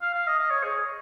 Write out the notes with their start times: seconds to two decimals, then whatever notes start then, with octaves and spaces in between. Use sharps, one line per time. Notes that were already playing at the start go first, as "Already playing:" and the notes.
0.02 F5
0.14 F5
0.27 D#5
0.39 D#5
0.51 C#5
0.64 G#4